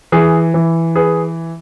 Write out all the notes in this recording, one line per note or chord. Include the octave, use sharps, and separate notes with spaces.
E3 G#4
E3
G#4 B4